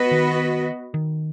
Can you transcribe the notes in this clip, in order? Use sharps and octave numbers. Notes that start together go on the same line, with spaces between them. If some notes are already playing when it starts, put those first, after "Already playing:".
Already playing: B3 F#4 B4 D#5
D#3
D#3